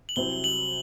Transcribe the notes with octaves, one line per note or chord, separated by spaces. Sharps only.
F#7
C2 C3 F#3 C4 G7
F#7